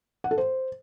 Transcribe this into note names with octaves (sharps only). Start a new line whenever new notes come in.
F#5
A4
C5